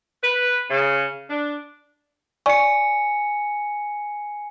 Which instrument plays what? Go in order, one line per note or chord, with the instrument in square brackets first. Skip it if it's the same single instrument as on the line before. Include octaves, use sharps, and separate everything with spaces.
[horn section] B4
C#3
D4
[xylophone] D5 C#6 [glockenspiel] G#5 C#7